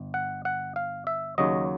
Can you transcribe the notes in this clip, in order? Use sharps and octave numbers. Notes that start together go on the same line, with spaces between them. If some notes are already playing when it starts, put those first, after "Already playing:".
Already playing: G1
F#5
F#5
F5
E5
D#2 C#3 F#3 D#5